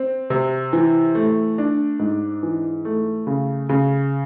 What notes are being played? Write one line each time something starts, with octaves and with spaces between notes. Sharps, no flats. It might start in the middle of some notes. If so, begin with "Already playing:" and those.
Already playing: C4
C3
E3
A3
D4
G#2
E3
A3
C#3
C#3